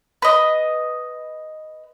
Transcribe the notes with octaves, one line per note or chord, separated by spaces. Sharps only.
B4 D#5